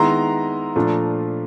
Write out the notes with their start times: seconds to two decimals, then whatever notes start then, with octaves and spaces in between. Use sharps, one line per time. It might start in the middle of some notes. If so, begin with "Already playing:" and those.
Already playing: D#3 G#3 B3 E4 A#5 C6
0.75 A#2 F3 A3 D4 F4